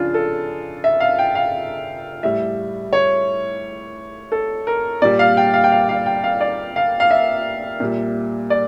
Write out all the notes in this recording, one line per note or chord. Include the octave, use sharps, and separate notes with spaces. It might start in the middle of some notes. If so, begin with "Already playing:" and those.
Already playing: C#3 F3 D4 F4
A4
E5
F5
G5
F5
A2 G3 E5
C#5
A4
A#4
A#2 G3 D5
F5
G5
F5
G5
F5
F5
G5
F5
D5
F5
F5
E5
A#2 G3
D5